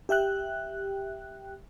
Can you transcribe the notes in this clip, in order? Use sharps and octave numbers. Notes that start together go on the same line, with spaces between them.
G4 E5 G5 F#6